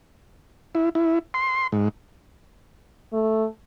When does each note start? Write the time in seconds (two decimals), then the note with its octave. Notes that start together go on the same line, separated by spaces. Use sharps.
0.75 E4
0.95 E4
1.34 C6
1.72 G#2
3.13 A3